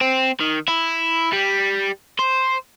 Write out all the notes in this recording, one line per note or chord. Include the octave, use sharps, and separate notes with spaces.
C4
D#3
E4
G3
C5